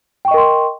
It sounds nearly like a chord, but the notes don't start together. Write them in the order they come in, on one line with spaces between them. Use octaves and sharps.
G5 C#6 D#5 A#4 C6